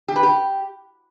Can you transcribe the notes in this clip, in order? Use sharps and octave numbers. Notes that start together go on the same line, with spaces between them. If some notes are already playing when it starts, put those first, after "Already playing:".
G4
B4
G4